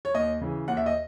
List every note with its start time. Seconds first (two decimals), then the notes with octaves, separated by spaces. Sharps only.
0.05 C#5
0.14 D#2 D#5
0.41 C#3 E3
0.68 D#2 F#5
0.77 E5
0.86 D#5